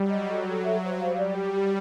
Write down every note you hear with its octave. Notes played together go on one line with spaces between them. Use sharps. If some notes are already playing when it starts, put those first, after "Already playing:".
Already playing: F#3 G3
D#5
A4
A4
E5
C5
G3 F5
D5
G4
G4